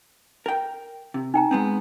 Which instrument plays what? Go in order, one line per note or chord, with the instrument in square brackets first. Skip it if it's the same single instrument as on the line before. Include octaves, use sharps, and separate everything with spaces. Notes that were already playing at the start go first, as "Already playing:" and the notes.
[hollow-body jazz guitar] A#4 G5
C3
[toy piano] D#4 G5 A#5
[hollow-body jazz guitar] G#3 B3 C4